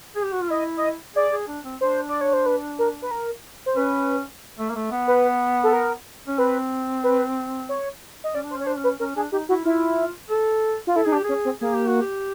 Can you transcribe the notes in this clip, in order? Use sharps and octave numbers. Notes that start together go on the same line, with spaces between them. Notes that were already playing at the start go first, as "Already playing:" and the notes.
G#4
G4
F#4
F4
E4 D#5
D#5
G#4 D5
G#4
D4
C4
D4 C5
D5
C#5
C5
B4
A#4
B4
A#4
C5
C#4 B4
A3
A#3
A3
B3
B4
A4
A#4
C#4
C4 B4
B4
C#5
D#5
C#4 D5
D4
C5
C#4 C#5
D4 C5
C#4
B4
C#4 A#4
D4 G#4
D#4 G4
E4 F#4
E4 F4
A4
F4
E4 A4
D#4 G#4
D4 G4
C#4 G#4
C4
A#3 G#4
G4
F#4
G4